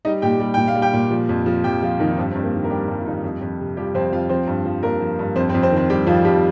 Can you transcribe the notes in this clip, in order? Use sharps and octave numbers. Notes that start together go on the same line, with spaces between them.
G3 D#4 D#5
A#2 G4 G5
G3
A#2 G5
F5
G3
G4 G5
A#2
F3
F2
F3
F2 G4 G5
F3 F4
F2 D#3 D#4
D#4
G2 C4
C4
G2
A#3
D#3
A#4
G3 G4
G2
F4
G2 D#3 D#4
F2
F2
C3
F3 G3 G4
F2 C4 C5
F2 F4 F5
F3 C4 C5
G2
F3
G2 A#3 A#4
F3
G2
F2 C4 C5
C4 C5
F2
C4 C5
D#3
C4 C5
G3 G4
F2 F3 F4
F2 G3 G4